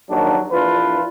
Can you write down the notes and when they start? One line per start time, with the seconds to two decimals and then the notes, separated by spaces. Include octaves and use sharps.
0.10 A#1 D#2 D#3 F#3 D4
0.52 A#1 E3 D4 F4 B4